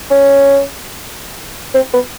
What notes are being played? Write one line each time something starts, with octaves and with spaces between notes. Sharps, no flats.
C#4
C4
B3